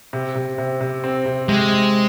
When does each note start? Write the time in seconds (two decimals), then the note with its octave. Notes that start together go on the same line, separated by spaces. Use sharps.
0.13 C3
0.35 C3
0.58 C3
0.81 C3
1.04 C4
1.26 C3
1.49 C3 G#3